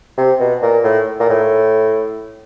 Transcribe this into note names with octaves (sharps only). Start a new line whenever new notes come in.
C3
B2
A#2
A2
A#2
A2